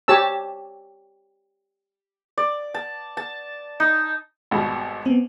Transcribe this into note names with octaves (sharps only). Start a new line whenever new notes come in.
G4 C#5 A5 E6
D5
A5
A5
D#4
G#1 B2 G3
B3 C4